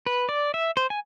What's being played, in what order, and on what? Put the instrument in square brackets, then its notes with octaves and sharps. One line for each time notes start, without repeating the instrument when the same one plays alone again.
[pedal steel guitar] B4
D5
E5
C5
G#5